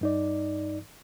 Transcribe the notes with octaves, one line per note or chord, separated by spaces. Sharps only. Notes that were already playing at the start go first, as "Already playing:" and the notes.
G2 D#4 D5